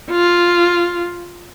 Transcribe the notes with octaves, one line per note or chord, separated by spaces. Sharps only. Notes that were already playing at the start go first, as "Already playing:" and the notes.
F4